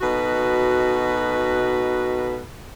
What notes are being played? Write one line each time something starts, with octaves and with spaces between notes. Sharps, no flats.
B2 D#4 F#4 A4 B4